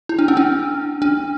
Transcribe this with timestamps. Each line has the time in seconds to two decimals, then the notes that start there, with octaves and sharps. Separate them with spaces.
0.09 E4
0.19 D4
0.28 C#4
0.37 D4
1.02 D4